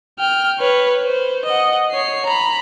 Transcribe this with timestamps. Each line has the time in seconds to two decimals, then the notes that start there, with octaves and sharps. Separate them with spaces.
0.19 G5 F6
0.60 B4 C#5
1.03 C5
1.46 D#5 F#5
1.92 C#5 C7
2.26 A#5 B5